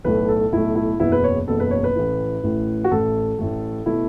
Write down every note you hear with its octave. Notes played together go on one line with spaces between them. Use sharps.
B1 A2 A3 B4
A4
B1 A2 A3 E4
E4
F#1 E2 B2 B3 E4
B4
C#5
F#1 E2 B2 B3 A4
B4
C#5
B4
A1 A2 E3
A1 A2 E3
F#4
A1 A2 A3 A4
A1 A2 A3
B2 A3 E4